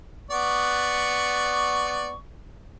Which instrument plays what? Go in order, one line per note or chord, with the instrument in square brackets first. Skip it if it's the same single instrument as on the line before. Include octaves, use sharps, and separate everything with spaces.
[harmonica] B3 D5 C#6